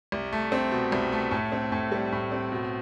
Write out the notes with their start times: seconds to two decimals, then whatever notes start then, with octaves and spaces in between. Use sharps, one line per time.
0.12 C2
0.33 A3
0.52 C4
0.71 B2
0.92 C2
1.12 A3
1.31 A2
1.52 C4
1.72 A2
1.92 G3
2.12 A2
2.32 C4
2.52 B2